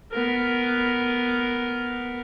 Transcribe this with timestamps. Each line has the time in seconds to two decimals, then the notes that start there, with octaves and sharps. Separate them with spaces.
0.12 B3 A#4